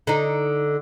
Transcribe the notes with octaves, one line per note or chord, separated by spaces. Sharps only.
D3 D#4